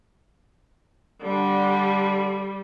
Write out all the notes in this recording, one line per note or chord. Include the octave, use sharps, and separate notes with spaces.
D3 G3